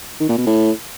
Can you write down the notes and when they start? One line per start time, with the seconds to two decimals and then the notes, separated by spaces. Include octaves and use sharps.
0.20 D#3
0.29 A#2
0.38 B2
0.47 A2